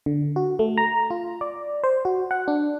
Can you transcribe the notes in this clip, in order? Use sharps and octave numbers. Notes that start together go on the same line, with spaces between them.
D3
F#4
A3
A#5
F4
D5
C5
F#4
F#5
D4